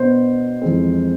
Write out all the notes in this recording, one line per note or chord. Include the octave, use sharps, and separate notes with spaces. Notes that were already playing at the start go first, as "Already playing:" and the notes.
Already playing: B2 B3 D4 C5
F2 E3 G#3 C4